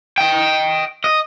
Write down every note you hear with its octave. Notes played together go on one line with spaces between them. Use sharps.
D#5 G5
D#5